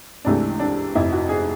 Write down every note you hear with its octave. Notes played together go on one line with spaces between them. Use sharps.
C#2 C3 E3 A3 D4
D4
F1 F2 C3 E4
F#4
G#4